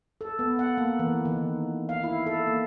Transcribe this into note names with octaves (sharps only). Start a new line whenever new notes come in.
A4
B3
F#5
A#3
E3
D#3
F5
E4
A4
A#3